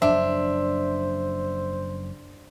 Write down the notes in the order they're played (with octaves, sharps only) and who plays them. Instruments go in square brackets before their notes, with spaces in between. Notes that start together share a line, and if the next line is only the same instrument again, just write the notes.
[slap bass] F#1 F#2 F3 [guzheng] D4 [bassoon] C5 [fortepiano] E5